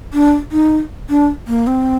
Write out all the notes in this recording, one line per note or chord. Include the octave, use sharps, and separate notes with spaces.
D4
D#4
D4
A#3
C4